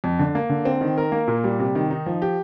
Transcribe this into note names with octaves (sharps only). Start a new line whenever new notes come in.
F2
D3
A#3
D3
C4
D#3
A#4
A#3
A#2
G3
C3
D#3
D#4
F3
G4